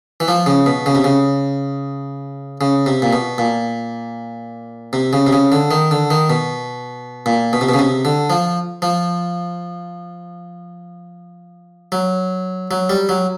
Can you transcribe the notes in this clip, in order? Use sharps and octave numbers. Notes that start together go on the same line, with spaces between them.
E3
F3
C#3
B2
C#3
C3
C#3
C#3
C3
A#2
B2
A#2
C3
C#3
C3
C#3
D3
D#3
D3
D#3
B2
A#2
B2
C3
B2
C#3
C3
D3
F3
F3
F#3
F#3
G3
F#3